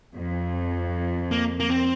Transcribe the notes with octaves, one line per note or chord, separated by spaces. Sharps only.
F2
A#3
A#3
C4